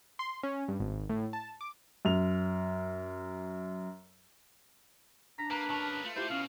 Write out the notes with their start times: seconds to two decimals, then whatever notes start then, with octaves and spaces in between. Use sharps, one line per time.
0.19 C6
0.43 C#4
0.68 G2
0.80 G#1
1.09 A2
1.33 A5
1.61 D6
2.05 F#2 F7
5.38 D4 A#5 B6
5.51 A#3 B4 A#5
5.70 C#3 A#4 A5 C#6
6.04 A3 F4
6.16 E4 F4 G4 C5
6.30 B2 C#4 F5